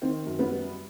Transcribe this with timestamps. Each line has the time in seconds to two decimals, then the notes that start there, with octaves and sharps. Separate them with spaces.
0.02 D#3 C4
0.27 F#2
0.39 B3
0.51 G3